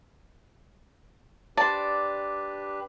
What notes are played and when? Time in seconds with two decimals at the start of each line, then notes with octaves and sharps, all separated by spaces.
1.57 D4 G4 B4 C5 D5 A5